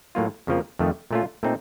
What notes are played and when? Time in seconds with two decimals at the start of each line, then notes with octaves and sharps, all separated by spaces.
0.15 A2 F#3 A#3 F4
0.47 F2 C#3 F3 A#3
0.79 F2 D#3 A3
1.11 A#2 A3 C#4 F4
1.43 A#2 A3 C4 D#4